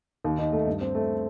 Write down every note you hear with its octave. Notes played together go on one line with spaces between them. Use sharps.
D#2
D#4
A3
G2
C4
A3